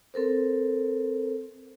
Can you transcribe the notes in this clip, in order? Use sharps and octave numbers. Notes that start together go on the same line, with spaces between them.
C4 A4 A#4 C5